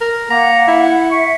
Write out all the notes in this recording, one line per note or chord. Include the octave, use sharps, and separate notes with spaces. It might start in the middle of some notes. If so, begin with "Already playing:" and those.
A#4
A#3 F#5 A#5
E4
E5 C#6